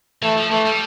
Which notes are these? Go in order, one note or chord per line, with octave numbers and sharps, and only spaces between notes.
E3 A3
F3
E3 A3
G3